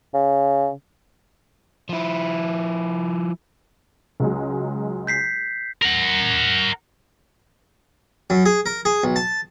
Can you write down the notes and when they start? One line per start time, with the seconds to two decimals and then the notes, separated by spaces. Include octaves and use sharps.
0.14 C#3
1.89 F3 E4
4.20 C#2 F#3 G#3
5.07 G6 B6 C7
5.82 A#4 F#5
8.30 F#2
8.46 G#4
8.66 A#4
8.85 G#4
9.04 B1
9.16 A5